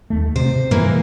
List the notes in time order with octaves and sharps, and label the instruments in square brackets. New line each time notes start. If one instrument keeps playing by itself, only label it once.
[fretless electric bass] D#2 A3
[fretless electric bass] C3 [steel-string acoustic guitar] C5
[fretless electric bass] G2 A#2 [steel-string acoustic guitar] E3 A#3 A#4
[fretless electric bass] G#3